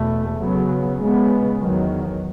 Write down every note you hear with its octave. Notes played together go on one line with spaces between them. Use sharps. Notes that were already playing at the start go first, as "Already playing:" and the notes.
Already playing: E2 B2 A3
C#3 F#3 B3
C#3 G#3 B3
E2 D#3 F#3